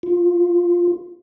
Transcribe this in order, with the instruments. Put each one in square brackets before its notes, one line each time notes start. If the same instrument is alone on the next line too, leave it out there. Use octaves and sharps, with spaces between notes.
[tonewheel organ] F4